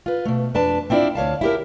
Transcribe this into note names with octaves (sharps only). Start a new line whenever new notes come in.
F4 B4
B2 A3
F2 D4 B4 A5
C4 D4 E4 F4 D5
D2 C#5 F5 A5
E4 G4 A#4